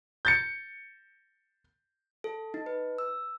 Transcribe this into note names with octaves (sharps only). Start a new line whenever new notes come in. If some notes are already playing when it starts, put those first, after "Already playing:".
G6 A6 C#7
A4
D#4
B4
E6